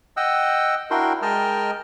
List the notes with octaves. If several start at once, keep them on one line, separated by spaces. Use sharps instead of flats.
D#5 F#5 G5 E6
D4 E4 F#4 A#4 G5 C6
G#3 A#4 D#5 G5 A5 F6